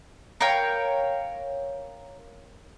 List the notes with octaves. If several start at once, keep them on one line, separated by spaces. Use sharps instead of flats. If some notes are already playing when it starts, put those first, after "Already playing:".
A#4 C#5 F5 G5